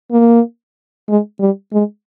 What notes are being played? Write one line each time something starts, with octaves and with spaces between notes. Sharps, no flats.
A#3
G#3
G3
G#3